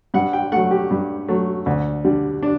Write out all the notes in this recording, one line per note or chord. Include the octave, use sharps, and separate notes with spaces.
G2 F#5
G5
F#3 A3 F#5
G4
G2
F#3 A3
D2
D3 G3
D4